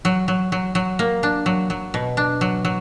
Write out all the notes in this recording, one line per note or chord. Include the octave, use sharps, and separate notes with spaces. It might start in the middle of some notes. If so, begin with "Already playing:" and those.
F#3
F#3
F#3
F#3
A#3
D4
F#3
F#3
B2
D4
F#3
F#3